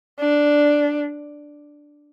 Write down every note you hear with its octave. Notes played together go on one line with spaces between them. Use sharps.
D4